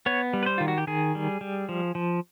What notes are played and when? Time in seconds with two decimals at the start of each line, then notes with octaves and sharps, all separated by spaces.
0.06 B3 C#5
0.33 G3
0.43 B4
0.46 C5
0.58 D#3 F4
0.68 F#4
0.78 G4
0.87 D#3 G#4
1.15 G3
1.41 G3
1.69 F3
1.95 F3